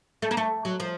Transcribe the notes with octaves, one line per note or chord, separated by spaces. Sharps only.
A3
A#3
A3
F#3
F3